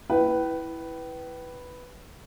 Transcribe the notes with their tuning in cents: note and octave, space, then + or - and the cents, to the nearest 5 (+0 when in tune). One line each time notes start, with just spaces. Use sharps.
E4 +0 B4 +0 G5 -30